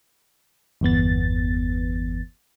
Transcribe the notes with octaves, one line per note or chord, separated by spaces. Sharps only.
G1 E2 B3 A6